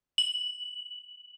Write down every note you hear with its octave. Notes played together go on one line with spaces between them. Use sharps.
F#7